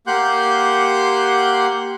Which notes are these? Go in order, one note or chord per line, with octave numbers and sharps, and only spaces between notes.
A#3 G4 F#5 C6 F#6 G6